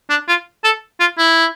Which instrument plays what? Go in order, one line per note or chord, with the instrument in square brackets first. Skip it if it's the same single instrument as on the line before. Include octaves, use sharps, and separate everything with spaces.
[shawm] D4
F4
A4
F4
E4